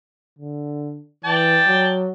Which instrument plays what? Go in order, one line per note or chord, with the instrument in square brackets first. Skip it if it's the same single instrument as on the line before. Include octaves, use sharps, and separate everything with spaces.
[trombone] D3
[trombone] E3 [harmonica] D5 G5 A5
[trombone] F#3